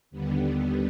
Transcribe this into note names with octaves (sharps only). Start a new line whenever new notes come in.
D#2 D3 G3 B3